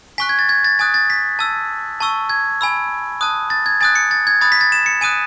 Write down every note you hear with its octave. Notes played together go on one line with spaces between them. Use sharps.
G#5 C#6 F#6 B6
G#6
A6
G#6
A6
G#5 D#6 F#6 A6
A6
B6
A5 E6
A5 C#6 E6
G#6
G#5 B5 E6
A5 D#6 F#6
A6
G#6
G#5 D#6 F#6 A6
C#7
A6
G#6
B5 D#6 F#6 A6
B6
A6
E7
C#7
G#5 D#6 F#6 D#7